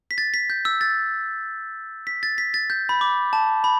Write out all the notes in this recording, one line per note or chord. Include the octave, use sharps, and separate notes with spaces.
B6
A6
B6
G6
E6
A6
B6
A6
B6
A6
G6
B5
D6
A5
B5